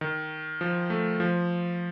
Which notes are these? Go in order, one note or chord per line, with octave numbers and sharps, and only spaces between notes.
D#3
F3
A3
F3